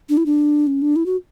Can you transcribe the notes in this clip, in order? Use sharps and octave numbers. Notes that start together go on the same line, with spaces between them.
D4
E4
D4
C#4
D4
E4
F#4